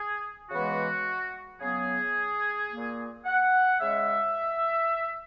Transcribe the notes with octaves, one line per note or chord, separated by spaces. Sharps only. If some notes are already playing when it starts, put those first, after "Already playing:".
Already playing: G#4
C#3 E3 G#3 B3 F#4
C#3 F#3 B3 G#4
A#2 A#3
F#5
C#3 G#3 E5